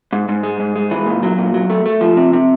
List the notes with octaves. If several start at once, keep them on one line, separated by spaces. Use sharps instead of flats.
G#2
G#2
G#3
G#2
G#3
E3
A#2
F#3
A#2
F#3
A3
A3
F3
C3
C3